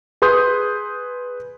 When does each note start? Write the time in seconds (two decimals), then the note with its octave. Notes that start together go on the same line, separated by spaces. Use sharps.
0.22 G#4 B4 C6 D#6 G6